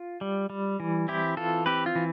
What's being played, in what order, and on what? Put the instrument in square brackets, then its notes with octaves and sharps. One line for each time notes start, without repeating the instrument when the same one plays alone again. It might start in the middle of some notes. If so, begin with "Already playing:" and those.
Already playing: [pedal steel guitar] F4
G3
G3
E3
C4 E4 G4
E3 F4 A4
C4 G4 B4
F4
E3